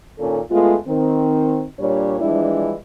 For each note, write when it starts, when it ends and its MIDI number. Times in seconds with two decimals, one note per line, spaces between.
0.19 0.38 46
0.19 0.38 51
0.19 0.38 61
0.19 0.38 69
0.50 0.74 56
0.50 0.74 57
0.50 0.74 59
0.50 0.74 65
0.86 1.64 51
0.86 1.64 60
1.80 2.18 46
1.80 2.18 55
1.80 2.18 62
1.80 2.18 73
2.21 2.73 52
2.21 2.73 53
2.21 2.73 55
2.21 2.73 56
2.21 2.73 62
2.21 2.73 64